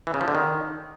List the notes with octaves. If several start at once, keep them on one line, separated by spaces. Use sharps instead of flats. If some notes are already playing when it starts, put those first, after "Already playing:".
E3
C#3
F3
D3
D#3